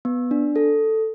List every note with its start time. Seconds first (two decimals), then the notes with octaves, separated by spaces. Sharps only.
0.05 B3
0.31 D4
0.56 A4